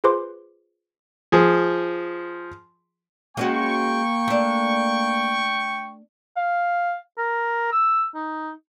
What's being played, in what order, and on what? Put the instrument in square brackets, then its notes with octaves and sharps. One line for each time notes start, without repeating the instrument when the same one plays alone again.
[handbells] F4 G#4 B4 C5 C6 D6
[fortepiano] F3 G#4
[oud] G#3 C#4 F#4 [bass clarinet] A#3 [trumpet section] G5 C#6
[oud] A3 D4
[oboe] F5
A#4
E6
D#4